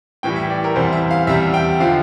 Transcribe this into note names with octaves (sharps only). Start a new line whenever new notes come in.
A2 E3 G3 G5
E5
D5
A#4
E2 C3 E3 G3 C5
E5
F5
E2 C3 G3 E5
G5
D3 F3 F5